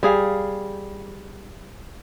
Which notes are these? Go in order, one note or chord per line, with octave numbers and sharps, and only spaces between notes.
G3 G#4 F5